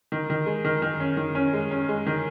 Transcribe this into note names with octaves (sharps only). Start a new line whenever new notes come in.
D#3
D#3
G#3
D#3
D#3
C#4
D#3
C#4
G#3
C#4
G#3
D#3